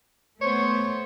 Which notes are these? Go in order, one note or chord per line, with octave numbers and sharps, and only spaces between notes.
A3 B3 C5 C#5